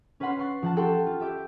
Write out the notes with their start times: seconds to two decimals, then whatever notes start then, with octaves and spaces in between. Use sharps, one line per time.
0.20 C#4 B4 F5 F#5 B5 C6
0.39 C6 C#6 F#6 A6
0.62 F3 F#5 A5
0.76 G4 A4 F#5 G5 C6 C#6
1.06 F4
1.20 G4 E5 D6 G6